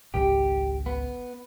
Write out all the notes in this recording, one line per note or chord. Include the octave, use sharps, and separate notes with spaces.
G#1 C#2 C#3 G4
B3